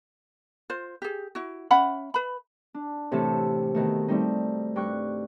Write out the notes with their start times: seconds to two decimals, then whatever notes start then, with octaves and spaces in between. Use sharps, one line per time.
0.70 F4 C5
1.02 G4 G#4
1.35 E4 F#4
1.71 C#4 E5 F#5 B5
2.14 B4 B5
2.74 D4
3.11 A2 C3 E3 A3 C4 A4
3.75 B2 D#3 A3
4.08 G3 A3 C4 D#4
4.76 G2 G5 C#6 F#6